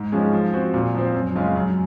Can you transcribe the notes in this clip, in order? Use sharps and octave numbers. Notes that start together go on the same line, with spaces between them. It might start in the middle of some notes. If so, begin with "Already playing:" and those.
Already playing: G#2
F3 G#3 C#4 G#4
F3
C4 F#4
A#2
F3 C4
F#2
C#3 G#3 C#4 F4
F#2